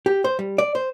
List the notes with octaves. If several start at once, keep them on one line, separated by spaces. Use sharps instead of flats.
G4
C5
G3
D5
C5